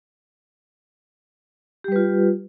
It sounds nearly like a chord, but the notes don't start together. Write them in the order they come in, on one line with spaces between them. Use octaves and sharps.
G4 G3 B4 F4